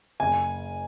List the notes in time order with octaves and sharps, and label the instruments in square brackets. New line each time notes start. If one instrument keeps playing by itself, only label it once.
[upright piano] F#1 G#5